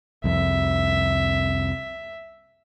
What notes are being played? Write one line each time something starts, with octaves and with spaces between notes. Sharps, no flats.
C2 F2 E5